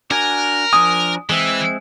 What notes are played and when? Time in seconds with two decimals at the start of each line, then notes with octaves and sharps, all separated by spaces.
0.11 D4 F#4 A#4 G#5
0.73 F3 D4 G#5 D#6
1.30 E3 G#3 C4 E5